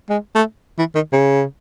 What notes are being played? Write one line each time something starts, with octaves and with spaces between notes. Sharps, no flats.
G#3
A3
E3
D#3
C#3